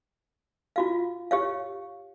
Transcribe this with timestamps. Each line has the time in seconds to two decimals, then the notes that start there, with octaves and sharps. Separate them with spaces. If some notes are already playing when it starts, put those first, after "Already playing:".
0.76 F4 F#4 F5
1.31 G4 C#5 F5